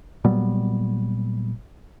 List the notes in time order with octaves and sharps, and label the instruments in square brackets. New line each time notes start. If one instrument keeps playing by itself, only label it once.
[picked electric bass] A#2 F#3 G3 B3